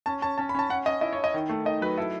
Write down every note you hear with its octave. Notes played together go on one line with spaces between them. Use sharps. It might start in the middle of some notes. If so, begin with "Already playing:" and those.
C#4 A5
C#4 A5
C#4 A5
B5
C#4 A5
C#4 F#5
C#4 D#5
E4 D#5
E4 C#5
D#5
D#3
A3
D#3 D#5
F#3 B4
E4 A4